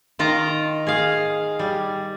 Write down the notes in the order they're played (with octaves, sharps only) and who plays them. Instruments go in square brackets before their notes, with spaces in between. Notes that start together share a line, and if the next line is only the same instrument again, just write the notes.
[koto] D#3 F4 A#5
G#4 F5
G3